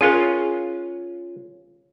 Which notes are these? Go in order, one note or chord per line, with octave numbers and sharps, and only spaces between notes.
C#4 F4 G#4 A#4